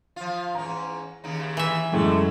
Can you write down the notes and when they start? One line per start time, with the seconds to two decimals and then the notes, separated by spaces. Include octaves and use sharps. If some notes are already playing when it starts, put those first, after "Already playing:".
0.16 F3 F4
0.55 E2 G#2 C#4 A#5
1.24 D#2 C#3 D#4
1.57 E3 E5
1.92 F#2 A2 D3 F#3 G#3 A3